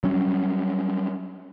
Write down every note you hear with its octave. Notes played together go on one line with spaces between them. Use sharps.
F#3 G3 C#4